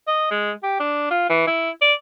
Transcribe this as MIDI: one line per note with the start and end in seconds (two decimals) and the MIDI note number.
0.07 0.27 75
0.31 0.51 56
0.63 0.75 67
0.80 1.07 62
1.10 1.28 65
1.29 1.44 52
1.47 1.70 64
1.81 1.93 74